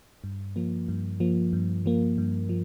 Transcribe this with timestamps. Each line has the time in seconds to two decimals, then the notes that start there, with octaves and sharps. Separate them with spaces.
0.24 G2
0.56 F3 A#3
0.88 G2
1.20 F3 A#3
1.53 G2
1.86 F3 A#3
2.18 G2
2.49 F3